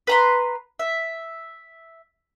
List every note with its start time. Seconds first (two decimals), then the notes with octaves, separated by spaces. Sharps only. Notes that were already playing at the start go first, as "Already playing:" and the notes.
0.07 B4 A#5 C6
0.79 E5